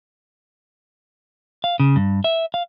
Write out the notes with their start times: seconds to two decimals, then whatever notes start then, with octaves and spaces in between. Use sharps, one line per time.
1.64 F5
1.80 C#3
1.96 G2
2.24 E5
2.54 F5